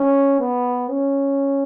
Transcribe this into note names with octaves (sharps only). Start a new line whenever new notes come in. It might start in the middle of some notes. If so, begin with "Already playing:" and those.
Already playing: C#4
B3
C#4